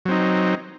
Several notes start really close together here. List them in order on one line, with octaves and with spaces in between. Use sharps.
F#3 C4 D#4